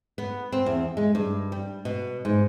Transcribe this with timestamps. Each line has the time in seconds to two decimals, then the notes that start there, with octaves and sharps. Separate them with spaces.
0.18 B3
0.52 C4
0.66 E2
0.97 G#3
1.15 G2
1.52 G3
1.85 B2
2.25 G#2